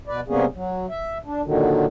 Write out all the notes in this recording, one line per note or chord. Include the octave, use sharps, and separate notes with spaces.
B2 B4 D5
C3 G3 A#3 B3 C#4 G#4
F#3
E5
D4
A#2 D3 D#3 F#3